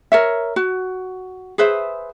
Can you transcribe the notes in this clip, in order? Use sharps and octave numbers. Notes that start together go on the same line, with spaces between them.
A#4 C#5 E5
F#4
G#4 B4 C5 E5